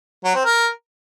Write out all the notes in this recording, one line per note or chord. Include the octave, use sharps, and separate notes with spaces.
F#3
C4
A#4